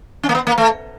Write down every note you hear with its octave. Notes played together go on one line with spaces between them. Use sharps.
C#4
A#3
B3
A#3
A3